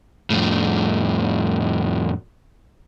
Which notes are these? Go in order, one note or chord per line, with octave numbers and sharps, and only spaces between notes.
F2 A2